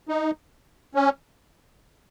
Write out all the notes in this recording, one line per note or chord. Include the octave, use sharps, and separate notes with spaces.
D#4
C#4